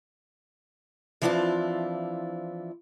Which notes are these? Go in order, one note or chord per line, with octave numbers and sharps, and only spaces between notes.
E3 F3 C4 D4 E4 F4